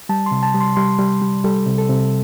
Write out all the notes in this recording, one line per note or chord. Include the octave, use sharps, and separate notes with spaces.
G3 A5
C6
C3
A5
G3
C6
G3 C6
G3
G3
G3 A4
C3
A4
C3